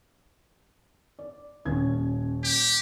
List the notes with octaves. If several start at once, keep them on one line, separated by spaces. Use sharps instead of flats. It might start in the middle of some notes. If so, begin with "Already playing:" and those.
D5
D#1 C#4 G#6
G4